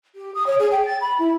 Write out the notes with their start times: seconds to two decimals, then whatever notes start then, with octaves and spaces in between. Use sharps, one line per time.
0.15 G4
0.34 D#6
0.46 C#5
0.59 G#4
0.71 G5
0.86 A6
1.01 B5
1.19 E4